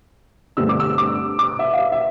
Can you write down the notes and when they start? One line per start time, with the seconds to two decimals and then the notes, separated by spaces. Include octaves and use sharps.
0.57 G2 D3 A3 C4 E6
0.69 D6
0.80 E6
0.98 D6
1.39 D6
1.59 E5
1.73 F5
1.79 E5
1.92 E5